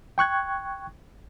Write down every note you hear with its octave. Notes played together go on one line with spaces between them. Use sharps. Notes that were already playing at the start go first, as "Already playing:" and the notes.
G5 C#6 F#6 G#6